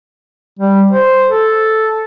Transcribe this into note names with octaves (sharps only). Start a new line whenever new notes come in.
G3
C5
A4